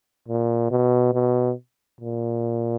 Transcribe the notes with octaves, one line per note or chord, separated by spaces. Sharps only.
A#2
B2
B2
A#2